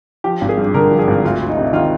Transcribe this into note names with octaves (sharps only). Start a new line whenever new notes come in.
F3 G4
G#1
G#4
G2
D3 A#4
F3
G#4
G#1
D2 F4
D2
D#4
C3
D#3 F4